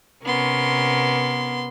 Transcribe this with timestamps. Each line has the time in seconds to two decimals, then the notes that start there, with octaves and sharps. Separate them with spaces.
0.25 C3 B3 C#4 A#4 C6